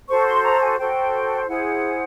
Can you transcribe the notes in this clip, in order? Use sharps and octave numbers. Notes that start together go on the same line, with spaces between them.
F#4 A4 C5 C#6
C6
A#5
G#5
F#4 A4 C5 G5
E4 G#4 C5 F#5